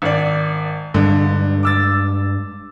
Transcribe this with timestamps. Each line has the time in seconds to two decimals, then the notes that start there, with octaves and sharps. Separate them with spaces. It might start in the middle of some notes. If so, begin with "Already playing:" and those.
0.02 G#1 D5
0.94 G2 D3 G#3
1.63 D6 E6 A6